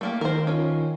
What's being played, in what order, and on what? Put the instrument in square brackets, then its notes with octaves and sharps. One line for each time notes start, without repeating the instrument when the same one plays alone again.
[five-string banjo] A3 A#3 G4
[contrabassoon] D#3 [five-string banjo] A#4 C5
[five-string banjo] C#4 F4